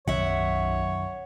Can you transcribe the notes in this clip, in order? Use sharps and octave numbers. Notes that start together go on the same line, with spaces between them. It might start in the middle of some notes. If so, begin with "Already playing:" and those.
B1 F#2 D#3 C#5 E5 F#5